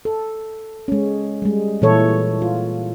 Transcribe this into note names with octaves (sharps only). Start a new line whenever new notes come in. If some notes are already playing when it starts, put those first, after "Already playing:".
A4
G#3 C#4
G3 G#3
A#2 E3 E4 A4 C#5
F4